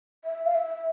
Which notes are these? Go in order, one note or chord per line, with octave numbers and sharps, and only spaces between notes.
E5
F5
E5